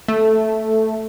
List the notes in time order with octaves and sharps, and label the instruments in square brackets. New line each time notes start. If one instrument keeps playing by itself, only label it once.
[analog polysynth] A3